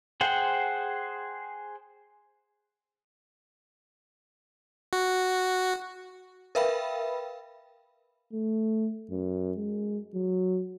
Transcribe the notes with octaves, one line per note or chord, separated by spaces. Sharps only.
G#4 C5 F#5 G5
F#4
A#4 B4 E5 F5 G5 B5
A3
F#2
G#3
F#3